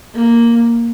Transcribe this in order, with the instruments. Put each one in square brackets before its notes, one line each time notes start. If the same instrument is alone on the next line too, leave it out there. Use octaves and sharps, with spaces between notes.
[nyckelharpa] A#3